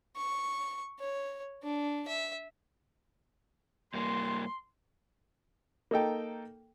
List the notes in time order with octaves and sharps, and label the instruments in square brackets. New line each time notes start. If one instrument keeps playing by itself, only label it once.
[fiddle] C#6
C#5
D4
E5
[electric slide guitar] G2 A#3 [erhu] C6
[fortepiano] A#3 D#4 A4 G5